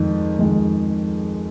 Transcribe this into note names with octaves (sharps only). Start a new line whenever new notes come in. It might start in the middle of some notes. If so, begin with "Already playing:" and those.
Already playing: F2 D#3 G#3
F2 D#3 G#3